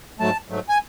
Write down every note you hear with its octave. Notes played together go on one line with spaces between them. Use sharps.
G#2 F#3 A3 A5
G#2 F#3 A3
G#5